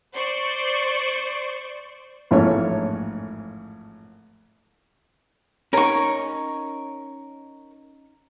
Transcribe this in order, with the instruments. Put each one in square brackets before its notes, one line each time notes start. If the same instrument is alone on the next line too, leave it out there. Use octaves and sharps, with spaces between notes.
[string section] C5 D5 C#6
[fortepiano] A1 F2 G#2 A3 A#3 C#5
[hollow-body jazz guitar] C#4 D#4 [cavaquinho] A#4 C#6